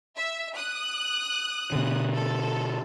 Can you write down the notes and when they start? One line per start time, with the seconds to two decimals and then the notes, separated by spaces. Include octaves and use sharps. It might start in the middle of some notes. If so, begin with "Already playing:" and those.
0.16 E5
0.55 D#6 F#6
1.72 B2 D3
2.15 A4